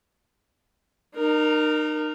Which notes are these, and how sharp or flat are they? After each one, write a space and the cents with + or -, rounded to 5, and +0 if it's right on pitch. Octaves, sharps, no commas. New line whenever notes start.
D#4 -35 A#4 +0